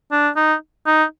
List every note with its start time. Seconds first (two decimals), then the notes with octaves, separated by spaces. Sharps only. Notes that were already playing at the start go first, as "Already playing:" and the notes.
0.12 D4
0.36 D#4
0.86 D#4